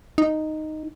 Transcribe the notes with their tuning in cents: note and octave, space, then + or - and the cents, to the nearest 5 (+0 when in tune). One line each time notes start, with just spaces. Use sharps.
D#4 -5